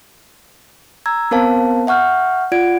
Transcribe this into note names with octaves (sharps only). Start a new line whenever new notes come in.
A#5 E6 G#6
B3 C4 A#4 C5 F5 A5
E5 F#5 C#6 F6 G6
F4 D5 F#5 G#6 D7